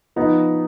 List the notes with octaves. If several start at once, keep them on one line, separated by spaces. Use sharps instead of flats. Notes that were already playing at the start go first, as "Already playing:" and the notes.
F3 B3 D#4